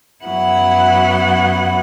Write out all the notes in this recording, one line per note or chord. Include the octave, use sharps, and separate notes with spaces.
F#2 F#3 B3 E4 F#5